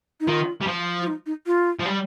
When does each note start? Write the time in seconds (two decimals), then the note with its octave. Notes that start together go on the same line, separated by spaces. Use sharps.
0.20 D#4
0.27 D#3 F4
0.61 G3
0.67 F3
1.02 F4
1.07 D#4
1.26 D#4
1.47 F4
1.79 F3
1.86 G3